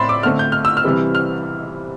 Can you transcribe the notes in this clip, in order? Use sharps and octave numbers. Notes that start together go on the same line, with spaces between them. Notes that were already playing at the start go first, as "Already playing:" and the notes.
Already playing: A2 C4 D5 E5 B5 C6
D6
D3 A3 C4 F6
G6
F6
E6
F6
C3 E3 G3 C4
F6